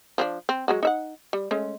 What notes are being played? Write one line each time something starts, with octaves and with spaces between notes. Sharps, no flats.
F3 C4 D4
C4
F#3 G#3 F#4
D#4 E5 F#5
G3
G#3 A3 C#4